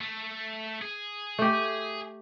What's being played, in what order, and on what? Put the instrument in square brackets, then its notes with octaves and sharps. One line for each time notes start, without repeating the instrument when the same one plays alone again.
[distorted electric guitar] A3
G#4
[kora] A3 G4